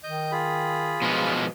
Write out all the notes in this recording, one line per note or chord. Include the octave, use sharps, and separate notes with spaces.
D#3 D#5 G6
F4 G#4 B5
B2 F3 G#3